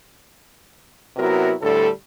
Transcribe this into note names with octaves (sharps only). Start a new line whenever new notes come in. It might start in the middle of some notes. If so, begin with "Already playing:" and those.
C3 F#3 B3 E4 F#4 A#4
D2 A2 D3 G3 A4